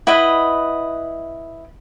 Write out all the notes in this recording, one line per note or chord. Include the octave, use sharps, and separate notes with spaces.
E4 B4 D#5 F#5